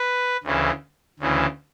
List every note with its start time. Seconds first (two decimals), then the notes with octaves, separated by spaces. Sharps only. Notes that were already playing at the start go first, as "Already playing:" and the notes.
Already playing: B4
0.44 D2 C#3 E3
1.19 D2 C#3 E3